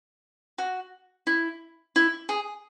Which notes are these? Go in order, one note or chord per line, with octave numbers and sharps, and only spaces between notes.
F#4
E4
E4
G#4